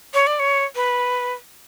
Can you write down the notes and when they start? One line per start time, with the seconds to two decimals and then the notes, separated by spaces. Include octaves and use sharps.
0.14 C#5
0.27 D5
0.39 C#5
0.75 B4